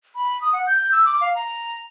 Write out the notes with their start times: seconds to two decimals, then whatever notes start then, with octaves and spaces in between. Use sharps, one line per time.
0.15 B5
0.41 D#6
0.53 F#5
0.67 G6
0.92 E6
1.05 D6
1.21 F5
1.35 A#5